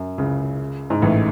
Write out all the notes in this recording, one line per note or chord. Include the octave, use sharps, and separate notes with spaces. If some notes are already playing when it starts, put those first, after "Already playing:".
Already playing: F#2
C#2 C#3
G#2
A1 A2